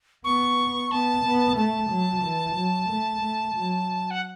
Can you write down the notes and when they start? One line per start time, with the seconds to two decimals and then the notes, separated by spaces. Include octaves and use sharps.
0.24 B3 C#6
0.91 B3 A5
1.25 B3
1.57 A3 A5
1.90 F#3
2.23 E3
2.56 F#3
2.90 A3
3.22 A3
3.55 F#3
4.11 F#5